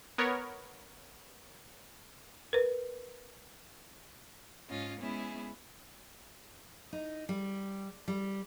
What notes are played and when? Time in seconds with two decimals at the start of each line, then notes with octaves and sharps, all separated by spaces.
0.18 B3 A#4 C#5
2.53 A#4 B4
4.68 G#2 C#4 F4 D#5
4.98 G#3 B3 C#4 E4 G#4
6.93 D#4
7.29 G3
8.08 G3